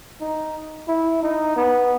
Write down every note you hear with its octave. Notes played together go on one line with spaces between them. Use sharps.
D#4
E4
D#4
B3